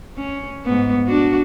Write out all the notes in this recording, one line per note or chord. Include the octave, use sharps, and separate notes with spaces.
C#4
G#2 B3
D4 F#4